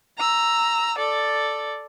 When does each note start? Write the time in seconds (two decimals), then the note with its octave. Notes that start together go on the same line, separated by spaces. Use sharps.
0.18 A#5 E6
0.98 A4 D5